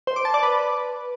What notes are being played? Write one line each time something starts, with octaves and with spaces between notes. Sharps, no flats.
C5
D6
A5
D5
B4